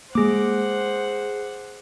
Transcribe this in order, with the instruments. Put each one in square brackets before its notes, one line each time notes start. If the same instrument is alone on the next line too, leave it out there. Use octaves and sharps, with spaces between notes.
[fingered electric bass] G#3 A#3 [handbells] G#4 D6 [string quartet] C5 F#5